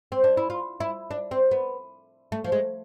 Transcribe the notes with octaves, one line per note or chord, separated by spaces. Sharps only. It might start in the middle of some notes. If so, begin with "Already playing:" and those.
C4
D4
E4
F4
E4
D4
C4
B3
A3
F3
G#3